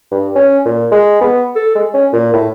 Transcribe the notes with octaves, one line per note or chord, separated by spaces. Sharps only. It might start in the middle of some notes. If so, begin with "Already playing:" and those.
G2
C#4
A#2
G#3
B3
A4
G#3
C#4
A#2
A2